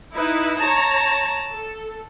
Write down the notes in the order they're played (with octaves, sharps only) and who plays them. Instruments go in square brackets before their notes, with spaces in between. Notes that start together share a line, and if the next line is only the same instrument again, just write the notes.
[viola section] D#4 E4 B4
[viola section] C#5 A#5 [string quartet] A5
[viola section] A4